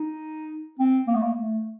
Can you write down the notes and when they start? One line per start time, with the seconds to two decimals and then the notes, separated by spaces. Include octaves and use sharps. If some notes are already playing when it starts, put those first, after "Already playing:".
Already playing: D#4
0.80 C4
1.08 A#3
1.15 A3
1.23 A#3
1.37 A3